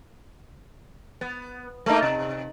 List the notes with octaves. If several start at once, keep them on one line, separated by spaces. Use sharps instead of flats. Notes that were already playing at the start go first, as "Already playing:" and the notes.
B3
A3 A#3 D#4
C3